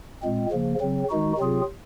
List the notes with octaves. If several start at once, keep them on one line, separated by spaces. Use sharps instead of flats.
A#2 G#3 C4
C#3 F3 A#3
C#3 F#3 C4
D#3 G#3 D#4 F#4
C3 F#3 C4 F4 G#4